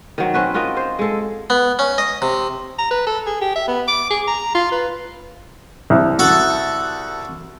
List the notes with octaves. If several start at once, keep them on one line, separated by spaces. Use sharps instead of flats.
D#3 F#3 C4
C4 C#4 F#4 B4
F4 F#4 A#4 D#5
C5
G#3 A4
B3
C#4
D#5
C3
A#5
B4
A4
G#4
G4
E5
B3
D6
G#4
A#5
F4
B4
C2
F#4 A4 F#5